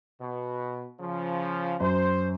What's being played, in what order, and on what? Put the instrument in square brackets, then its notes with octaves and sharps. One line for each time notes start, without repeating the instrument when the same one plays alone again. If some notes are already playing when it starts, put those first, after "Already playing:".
[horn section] B2
C#3 F3
[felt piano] F#2 [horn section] C5